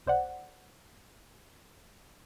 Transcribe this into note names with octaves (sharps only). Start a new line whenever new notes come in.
C2 C5 D5 F#5